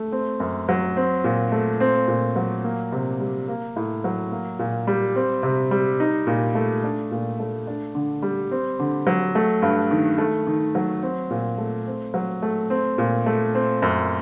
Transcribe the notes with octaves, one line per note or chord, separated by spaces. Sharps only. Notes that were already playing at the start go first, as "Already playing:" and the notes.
Already playing: A3
C4
F#2
F#3
C4
A#2
A3
C4
A#2
F#3
A#3
C3
G3
A#3
A2
F#3
A#3
A#2
G3
C4
C3
G3
D#4
A#2
A3
D4
A#2
A3
D4
D3
G3
C4
D3
F#3
A3
G2
D#3
A3
D#3
F#3
C4
A#2
A3
C4
F#3
A3
C4
A#2
A3
C4
F#2